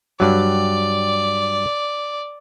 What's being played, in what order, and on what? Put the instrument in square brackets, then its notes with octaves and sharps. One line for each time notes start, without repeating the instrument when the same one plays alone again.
[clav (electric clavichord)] G2 F#3 [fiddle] D5